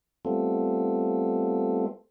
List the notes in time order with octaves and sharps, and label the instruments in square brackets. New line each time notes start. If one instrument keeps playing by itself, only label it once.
[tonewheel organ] G3 A3 B3 C4 F4 A4